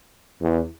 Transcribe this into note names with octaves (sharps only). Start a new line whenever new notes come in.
E2